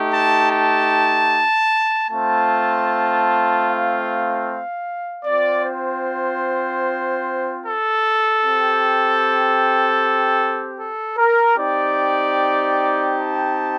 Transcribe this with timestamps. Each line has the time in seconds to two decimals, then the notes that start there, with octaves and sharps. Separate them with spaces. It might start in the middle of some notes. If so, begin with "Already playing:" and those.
Already playing: A3 D#4 G4
0.11 A5
0.50 A5
2.08 A3 C4 F4 A5
3.66 F5
5.24 C4 F4 D5
5.64 C5
7.62 A4
8.41 C4 G4
10.78 A4
11.17 A#4
11.56 C4 D#4 G4 D5
13.15 A5